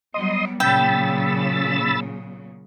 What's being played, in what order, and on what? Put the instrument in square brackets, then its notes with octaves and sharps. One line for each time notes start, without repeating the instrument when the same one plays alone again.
[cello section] F#3 G3 B3 [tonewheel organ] D#5 C6 D#6
[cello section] A#2 C#3 F#3 [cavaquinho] G5 [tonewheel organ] B5 E6 A6